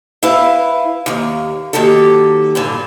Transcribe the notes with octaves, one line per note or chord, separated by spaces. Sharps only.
E4 B4 F5
D#2 A#3
D#3 F#3 A#3 G4 A4
G2 A#2 D3